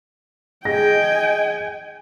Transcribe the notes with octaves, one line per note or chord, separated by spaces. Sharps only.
G#4 D#5 G5 G#5 A#6